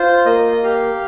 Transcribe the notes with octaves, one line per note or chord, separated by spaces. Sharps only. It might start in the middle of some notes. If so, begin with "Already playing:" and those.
Already playing: F4 C5
A#3 D#5
G4 F5